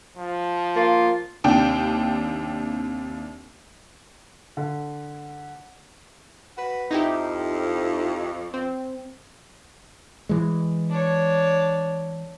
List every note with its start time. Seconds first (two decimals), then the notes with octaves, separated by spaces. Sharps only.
0.17 F3
0.76 A#3 F4
1.44 D#2 C3 D4 G5
4.57 D3
6.58 F#4 B4
6.91 F2 D#4 E4 G4
8.54 C4
10.29 E3 G#3
10.90 D4 C#5